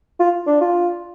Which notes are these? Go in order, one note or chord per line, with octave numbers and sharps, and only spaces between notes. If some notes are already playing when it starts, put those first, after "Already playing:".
F4
D4
F4